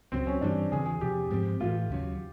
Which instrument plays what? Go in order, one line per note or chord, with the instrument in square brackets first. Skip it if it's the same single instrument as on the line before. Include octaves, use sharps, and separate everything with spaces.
[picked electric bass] C#2 C#3 F#3 [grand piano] C4
[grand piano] C#4
[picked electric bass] G2 E3 G3 [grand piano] D4
[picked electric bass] E2 C#3 E3 [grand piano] G#4
[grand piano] G#4
[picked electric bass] E2 C3 F3 [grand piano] G4
[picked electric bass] G#2 F3 G#3 C4
[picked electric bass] A2 E3 A3 [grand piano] F4
[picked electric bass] D#2 C#3 F#3